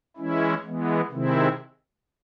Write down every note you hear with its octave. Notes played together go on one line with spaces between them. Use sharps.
E3 G#3 C#4 E4
E3 G#3 B3
C3 D#3 G#3 C4 E4